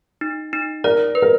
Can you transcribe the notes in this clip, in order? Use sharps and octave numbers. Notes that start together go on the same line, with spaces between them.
D#4
D#4
A#4 D5
B4
A#4